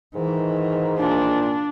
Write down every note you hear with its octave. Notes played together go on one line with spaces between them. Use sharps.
G#2 D#3 E3
A#2 D4